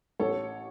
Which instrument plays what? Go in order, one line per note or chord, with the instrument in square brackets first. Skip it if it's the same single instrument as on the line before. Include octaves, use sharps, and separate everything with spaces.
[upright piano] A1 A4 C#5